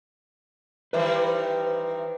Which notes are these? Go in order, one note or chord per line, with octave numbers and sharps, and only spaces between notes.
D#3 E3 G3 B4 C5